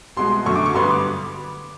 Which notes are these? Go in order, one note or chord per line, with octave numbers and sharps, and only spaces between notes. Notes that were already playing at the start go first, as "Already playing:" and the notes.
C2 B2 G#3 C6
F#2 D3 F#3 A3 C#6
D6
C#6
G2 D3 G3 B3 C6
D6